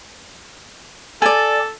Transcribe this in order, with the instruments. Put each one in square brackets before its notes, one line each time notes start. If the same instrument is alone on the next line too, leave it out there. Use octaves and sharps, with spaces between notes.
[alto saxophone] A4 [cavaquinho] D5 G#5